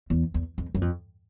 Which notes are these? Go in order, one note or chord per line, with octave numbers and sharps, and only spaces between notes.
E2
E2
F2
F#2
F2